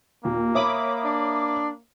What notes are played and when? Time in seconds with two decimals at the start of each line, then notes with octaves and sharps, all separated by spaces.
0.24 D#2 A#2 A#3
0.55 C#5 E5 B5 D6 D#6
1.04 D4